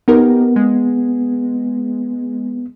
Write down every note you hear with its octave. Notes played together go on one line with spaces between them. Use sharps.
B3 D#4 G4 A#4
G#3